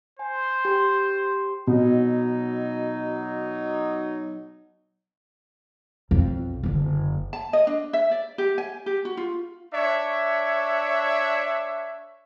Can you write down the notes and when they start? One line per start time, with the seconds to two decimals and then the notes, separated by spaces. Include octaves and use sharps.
0.19 C5 G#5
0.65 G4 C6
1.67 B2 F#3 D#4
6.11 B1 F2
6.63 F#1 D3
7.33 A5
7.53 D#5
7.67 D4
7.93 E5
8.11 D5
8.38 G4
8.58 G#5
8.86 G4
9.05 F#4
9.17 F4
9.74 D4 C#5 E5